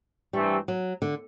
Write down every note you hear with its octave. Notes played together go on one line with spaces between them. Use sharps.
G2 E3 G3 A3 C4
F#3
D3